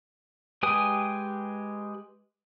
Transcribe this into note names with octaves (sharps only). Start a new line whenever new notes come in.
G#3 G4 B4 G#5 D#6